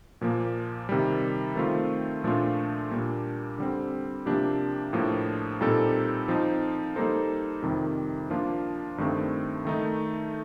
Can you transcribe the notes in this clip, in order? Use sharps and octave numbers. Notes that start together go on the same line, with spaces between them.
A#2 F3 A#3
C3 D#3 G3
D#3 A3 C4 F4
A#2 F3 A3 D4 F4
A#2 G3 A#3 D4
D3 G3 C4
C3 F3 A#3 D4 G4
A2 F3 A#3 D4
A#2 G3 C4 D#4 A4
F3 C4 D#4
G3 A#3 D#4 A4 C5
F2 C3 D#3 G3
F3 A#3 D4 F4
G2 D#3 A3 C4
D#3 A3 D#4